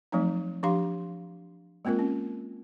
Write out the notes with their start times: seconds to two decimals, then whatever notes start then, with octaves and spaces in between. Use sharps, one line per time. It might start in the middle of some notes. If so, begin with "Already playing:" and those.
0.12 F3 F#3 A3 C4 D#4
0.63 F3 D4 G4 F5 C6
1.85 G#3 A#3 C4 F4 A#4
1.99 C#4